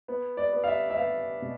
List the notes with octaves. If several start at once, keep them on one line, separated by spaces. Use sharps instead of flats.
B3
D5
B3
F5
E5
E5
B3 F5
B2